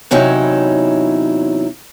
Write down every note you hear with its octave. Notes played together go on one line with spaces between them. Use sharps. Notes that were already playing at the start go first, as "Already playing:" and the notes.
E2 C3 F#3 C#4 D#4 E4